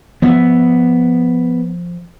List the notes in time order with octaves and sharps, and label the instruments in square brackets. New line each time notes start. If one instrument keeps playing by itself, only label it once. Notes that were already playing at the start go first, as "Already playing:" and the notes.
[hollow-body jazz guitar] F3 E5 [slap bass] B3